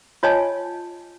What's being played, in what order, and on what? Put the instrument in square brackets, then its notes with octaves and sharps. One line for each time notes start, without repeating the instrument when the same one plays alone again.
[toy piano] F4 C#5 D#5 G#5 A5